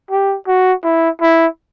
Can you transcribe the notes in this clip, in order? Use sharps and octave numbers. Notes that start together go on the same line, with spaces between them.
G4
F#4
E4
E4